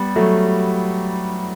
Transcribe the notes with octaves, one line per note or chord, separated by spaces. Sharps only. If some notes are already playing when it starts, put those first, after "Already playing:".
Already playing: G3 B3
F#3 A3